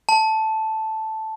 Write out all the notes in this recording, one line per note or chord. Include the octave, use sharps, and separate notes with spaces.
A5